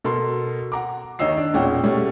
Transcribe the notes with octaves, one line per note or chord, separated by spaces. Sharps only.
B2 A4 A#4 C6
F#5 A#5 D6
D#2 D#3 C#5 D#5 E6 C7
D4
E1 A#2 C#4 F#5 G5
B2 G3 A3 C#4